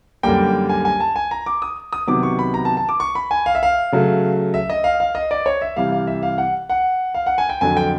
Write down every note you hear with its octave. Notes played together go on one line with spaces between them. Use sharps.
F#2 D3 G3 A#3 G5
G#5
G#5
A5
G#5
A#5
D6
D#6
D#6
C3 D#3 F#3 B3 D6
C#6
B5
A#5
A5
A5
D6
C#6
B5
G#5
F5
E5
F5
C#3 F#3 A3
E5
D#5
F5
F5
D#5
D5
C#5
E5
C3 E3 G3 F5
F5
E5
F5
F#5
F#5
F5
F#5
G#5
G5
F2 D3 F#3 G#5
G5